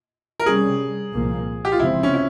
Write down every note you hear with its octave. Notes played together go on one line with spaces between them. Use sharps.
A#4
C3 G3 C#4 G#4
C2 A#2 F3 A#3
G4
F4
C#2 C3 F3 C4 E4
C#4
E4